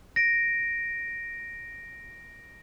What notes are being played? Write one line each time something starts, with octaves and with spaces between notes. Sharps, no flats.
A#6 D7